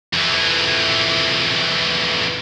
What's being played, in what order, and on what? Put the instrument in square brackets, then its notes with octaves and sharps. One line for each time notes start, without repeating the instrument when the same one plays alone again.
[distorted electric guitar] F2 E3